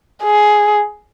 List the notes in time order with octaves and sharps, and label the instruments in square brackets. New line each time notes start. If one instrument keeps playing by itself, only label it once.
[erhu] G#4